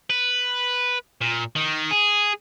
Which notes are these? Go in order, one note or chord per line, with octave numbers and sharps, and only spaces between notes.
B4
A#2
D#3
G#4